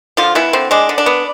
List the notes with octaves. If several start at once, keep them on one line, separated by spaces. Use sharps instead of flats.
D3 F3 F4
E3 B3 E4
D3 C4
G#3 D4
D3
D4
B3